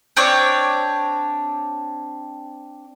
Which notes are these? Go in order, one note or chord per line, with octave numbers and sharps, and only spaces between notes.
C4 D4 C#5 D5